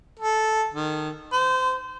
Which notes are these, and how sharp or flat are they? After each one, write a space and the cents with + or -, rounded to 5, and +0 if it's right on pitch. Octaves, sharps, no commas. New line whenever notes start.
A4 -10
D#3 -20
C5 -25